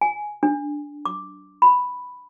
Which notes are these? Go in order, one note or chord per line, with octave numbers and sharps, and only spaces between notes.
G#5
D4
D6
B5